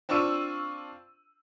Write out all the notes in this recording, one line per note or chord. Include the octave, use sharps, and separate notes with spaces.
C4 D4 F4 C#6 E6 D#7